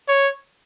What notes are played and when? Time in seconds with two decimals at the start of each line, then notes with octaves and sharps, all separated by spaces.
0.08 C#5